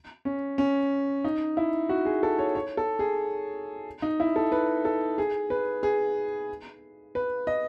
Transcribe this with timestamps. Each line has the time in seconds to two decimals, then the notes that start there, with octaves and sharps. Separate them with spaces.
0.25 C#4
0.58 C#4
1.24 D#4
1.57 E4
1.89 F#4
2.05 G#4
2.23 A4
2.39 C#5
2.55 C#5
2.77 A4
2.99 G#4
4.02 D#4
4.20 E4
4.36 A4
4.52 B4
4.85 A4
5.18 G#4
5.50 B4
5.83 G#4
7.15 B4
7.47 D#5